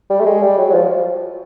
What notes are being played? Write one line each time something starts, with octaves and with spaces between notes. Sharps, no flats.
G3
A3
G#3
G3
F#3
F#3
F3